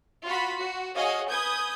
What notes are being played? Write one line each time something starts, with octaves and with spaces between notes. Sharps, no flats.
F4 F#4 B5
F#4
F#4 G#4 C#5 D#5 F5
B4 G#5 D#6 G6 G#6